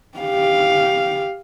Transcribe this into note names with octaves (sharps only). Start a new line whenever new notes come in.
G4 F5